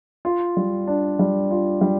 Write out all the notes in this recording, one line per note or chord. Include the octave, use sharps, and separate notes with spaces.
F4
G3
D4
G3
F4
G3